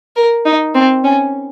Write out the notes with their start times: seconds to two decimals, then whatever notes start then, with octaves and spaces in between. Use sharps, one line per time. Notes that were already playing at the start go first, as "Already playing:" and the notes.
0.16 A#4
0.45 D#4
0.75 C4
1.04 C#4